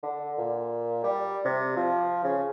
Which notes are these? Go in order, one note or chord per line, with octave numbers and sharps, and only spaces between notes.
D3
A#2
G3
C3
F3
C#3